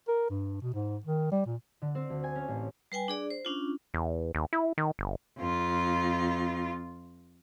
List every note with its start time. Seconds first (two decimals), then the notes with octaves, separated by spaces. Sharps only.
0.08 A#4
0.30 G2
0.62 B2
0.74 G#2
1.06 D#3
1.32 G3
1.46 A#2
1.82 D3
1.95 C4
2.10 D2
2.24 G#5
2.35 C#4
2.48 A1
2.92 G3 B4 G5 G#5
3.08 D4 G#4 D5
3.30 C5
3.45 C#4 D4 F4
3.94 E2
4.35 D#2
4.53 E4
4.78 D#3
4.99 G1
5.39 F2 F4